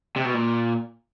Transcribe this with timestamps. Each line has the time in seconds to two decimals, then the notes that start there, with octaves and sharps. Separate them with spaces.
0.16 C3
0.25 B2
0.34 A#2